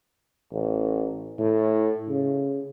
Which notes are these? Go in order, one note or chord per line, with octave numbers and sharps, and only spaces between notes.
A1
A2
C#3